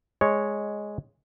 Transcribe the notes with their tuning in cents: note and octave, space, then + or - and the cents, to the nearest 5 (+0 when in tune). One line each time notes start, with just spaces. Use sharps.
G#3 +0 C#5 +0